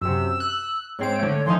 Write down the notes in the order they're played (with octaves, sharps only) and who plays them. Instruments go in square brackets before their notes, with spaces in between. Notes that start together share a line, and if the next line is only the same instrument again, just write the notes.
[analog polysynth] F#2 C3 [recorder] E6
[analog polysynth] F#6
[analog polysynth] G#2 C4 D7 [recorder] C#5
[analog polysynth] D3 A3
[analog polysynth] E3 F3 D#4 [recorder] C6